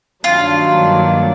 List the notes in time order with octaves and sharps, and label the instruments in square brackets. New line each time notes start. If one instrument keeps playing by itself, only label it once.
[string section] G2 D#3 F#3 A#3 D4 [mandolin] F4